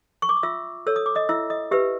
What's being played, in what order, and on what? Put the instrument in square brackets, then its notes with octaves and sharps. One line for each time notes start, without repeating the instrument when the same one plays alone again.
[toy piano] C#6
D6
D#6
F4 E5 E6
A4 C#5 E6
D#6
D6
D#5 D#6
E4 E5 E6
D#5 D#6
G4 B4 E5 E6